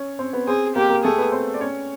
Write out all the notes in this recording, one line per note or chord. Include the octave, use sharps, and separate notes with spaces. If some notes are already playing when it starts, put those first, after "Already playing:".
Already playing: C#4 C#5
C4 C5
B3 B4
C4 G#4 C5
A#3 G4 A#4
A#3 A#4
A3 G#4 A4
B3 B4
C4 C5
D5
C#4 C#5